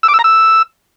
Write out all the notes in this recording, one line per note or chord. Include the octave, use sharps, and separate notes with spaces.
E6
D6
E6
A#5
E6